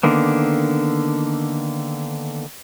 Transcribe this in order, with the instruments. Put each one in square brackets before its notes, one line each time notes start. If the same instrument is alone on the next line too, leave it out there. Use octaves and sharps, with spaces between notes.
[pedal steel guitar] D3 D#3 A#3 B3